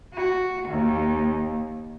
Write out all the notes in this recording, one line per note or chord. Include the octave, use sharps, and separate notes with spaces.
F#4
D#2